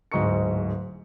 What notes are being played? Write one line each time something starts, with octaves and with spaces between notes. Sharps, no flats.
D1 G#2 D#5 C#6 C#7